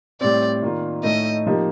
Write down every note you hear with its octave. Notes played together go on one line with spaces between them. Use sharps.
A2 G3 C4 D5
D#3 A#3 F4
A2 A3 D#4 D#5
C3 F3 A#3 D#4 G4